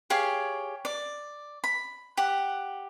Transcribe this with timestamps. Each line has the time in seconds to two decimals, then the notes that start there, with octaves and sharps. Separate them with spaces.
0.10 G4 G#4 C#5 F5
0.85 D5
1.64 B5
2.17 G4 F#5